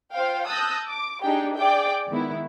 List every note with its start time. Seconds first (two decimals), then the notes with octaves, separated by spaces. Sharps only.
0.14 F4 C5 F5 G5
0.48 A5 D#6 E6 F#6 G6 A#6
0.88 D6
1.23 D4 D#4 G4 G#4 G5
1.57 G#4 D5 E5 G5 D6
2.09 D#3 G#3 B3 E4